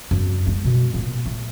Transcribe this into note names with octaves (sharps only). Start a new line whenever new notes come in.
F#2
G#3
B2
A#2
A3